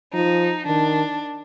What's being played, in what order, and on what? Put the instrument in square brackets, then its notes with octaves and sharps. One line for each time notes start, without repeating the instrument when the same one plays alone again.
[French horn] F3 [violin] D#4
[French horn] D#3 [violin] D4